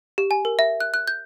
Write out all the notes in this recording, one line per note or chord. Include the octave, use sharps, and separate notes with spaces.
G4
G#5
A#4
E5
F#6
F#6
G6